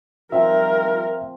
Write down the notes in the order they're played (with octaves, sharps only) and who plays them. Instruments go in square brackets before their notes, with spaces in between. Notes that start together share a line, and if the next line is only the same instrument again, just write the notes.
[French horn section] D#3 G3 F4 [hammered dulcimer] F3 C4 [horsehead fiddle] A#4 [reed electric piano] E5